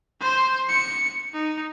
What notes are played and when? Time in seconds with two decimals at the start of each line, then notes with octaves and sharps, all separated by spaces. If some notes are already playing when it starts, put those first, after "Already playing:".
0.20 C5 C6
0.69 C#7
1.34 D#4